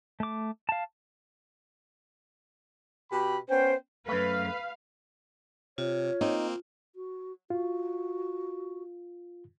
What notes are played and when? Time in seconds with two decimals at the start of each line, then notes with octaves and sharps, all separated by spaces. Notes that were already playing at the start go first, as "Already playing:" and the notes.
0.20 A3 D6
0.69 F5 A5
3.11 B2 G4 B5
3.49 B3 C#4 C5 G5
4.08 F#2 A3 B4 F5
5.78 C3 F4 C#5
6.21 A#3 C4 D#4
6.95 F#4
7.50 F4 F#4